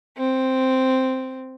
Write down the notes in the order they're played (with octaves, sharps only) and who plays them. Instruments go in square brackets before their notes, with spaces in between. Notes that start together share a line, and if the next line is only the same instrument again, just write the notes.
[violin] C4